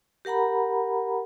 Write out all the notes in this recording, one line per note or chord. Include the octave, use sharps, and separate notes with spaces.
G4 A#4 F#5 A#5 B5